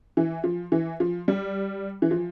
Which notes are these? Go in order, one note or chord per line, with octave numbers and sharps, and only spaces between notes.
E3
F3
E3
F3
G3
E3
F3